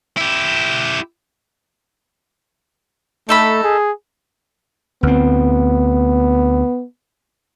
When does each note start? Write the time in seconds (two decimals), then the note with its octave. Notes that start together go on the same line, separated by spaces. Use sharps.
0.17 E4 G4
3.29 A3 D#4 A4 B5
3.63 G#4
5.03 D2 B3 C4